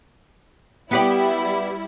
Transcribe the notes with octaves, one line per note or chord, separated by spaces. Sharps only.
G3 B3 E4 G4 D5